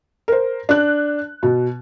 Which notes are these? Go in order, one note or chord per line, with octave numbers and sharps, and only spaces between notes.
A#4 C5
D4 F#6
B2